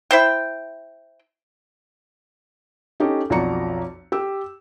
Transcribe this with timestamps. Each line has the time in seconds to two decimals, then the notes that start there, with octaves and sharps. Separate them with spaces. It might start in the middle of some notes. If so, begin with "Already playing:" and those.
0.11 E4 C5 G5
3.00 C#4 D#4 G4 A4
3.30 B1 F2 F#4 D5 A#5 C#7
4.12 G4 E6